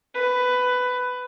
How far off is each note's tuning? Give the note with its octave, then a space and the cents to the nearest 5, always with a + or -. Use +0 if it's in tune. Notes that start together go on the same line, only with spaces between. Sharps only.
B4 +15